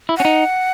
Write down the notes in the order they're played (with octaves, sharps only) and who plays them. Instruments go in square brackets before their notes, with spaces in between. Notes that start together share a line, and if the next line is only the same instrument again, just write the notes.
[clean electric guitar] E4
[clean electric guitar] C#4 [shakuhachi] F#5
[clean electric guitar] D#4